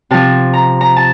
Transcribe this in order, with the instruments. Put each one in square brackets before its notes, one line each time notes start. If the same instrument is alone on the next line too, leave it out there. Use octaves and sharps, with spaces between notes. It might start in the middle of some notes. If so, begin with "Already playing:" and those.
[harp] C3 F3 A5
A#5
A#5
A5